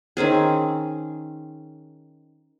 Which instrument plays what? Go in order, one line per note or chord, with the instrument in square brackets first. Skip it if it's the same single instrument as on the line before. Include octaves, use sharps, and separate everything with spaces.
[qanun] D#3 C4 C#4 G#4